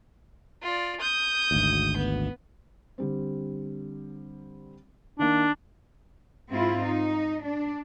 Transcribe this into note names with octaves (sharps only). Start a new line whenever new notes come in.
F4 D5
D#6 G6
G#1 D2
B3
D3 G3 C4
D#3 A#3 D4
G#2 C4 E4 F4
D#4
D4